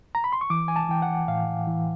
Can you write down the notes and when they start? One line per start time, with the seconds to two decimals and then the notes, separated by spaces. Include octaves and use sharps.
0.15 A#5
0.24 B5
0.32 C6
0.41 C#6
0.50 E3 D6
0.68 G#5
0.76 A5
0.89 E3 G5
1.02 F#5
1.28 A2 F5
1.67 E3